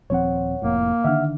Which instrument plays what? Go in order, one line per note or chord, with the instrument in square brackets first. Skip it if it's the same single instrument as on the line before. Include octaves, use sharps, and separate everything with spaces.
[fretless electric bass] D#1 F3 C4 [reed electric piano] C#5 F#5
[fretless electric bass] F1 F2 A2 [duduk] A#3
[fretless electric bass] D3 D#3 D4 [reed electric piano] E5 F#5 F6